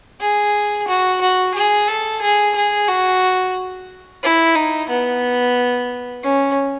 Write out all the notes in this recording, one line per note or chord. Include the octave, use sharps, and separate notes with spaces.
G#4
F#4
F#4
G#4
A4
G#4
G#4
F#4
E4
D#4
B3
C#4